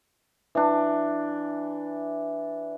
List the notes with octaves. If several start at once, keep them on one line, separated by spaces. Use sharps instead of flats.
E3 D4